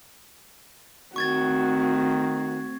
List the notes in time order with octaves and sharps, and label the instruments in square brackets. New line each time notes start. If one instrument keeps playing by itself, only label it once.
[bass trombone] D#3 [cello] A3 C4 [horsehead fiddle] F#4 [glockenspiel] C#6 G#6 A6